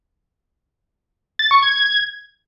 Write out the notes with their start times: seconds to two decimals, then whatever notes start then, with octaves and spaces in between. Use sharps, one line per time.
1.39 A6
1.51 C#6
1.62 G#6